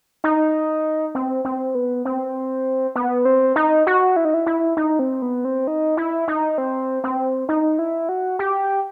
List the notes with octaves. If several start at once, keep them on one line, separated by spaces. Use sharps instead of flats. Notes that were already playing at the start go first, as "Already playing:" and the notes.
D#4
C4
C4
B3
C4
B3
C4
D#4
F#4
E4
D#4
E4
E4
D#4
C4
B3
C4
D#4
E4
D#4
C4
C4
D#4
E4
F#4
G4